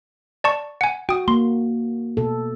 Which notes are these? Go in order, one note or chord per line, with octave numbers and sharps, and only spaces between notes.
D5 A5 C#6
F#5 G#5
F#4 G5 D#6
A#3 C6
B2 A4